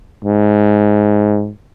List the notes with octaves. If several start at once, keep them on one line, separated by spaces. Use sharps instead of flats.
G#2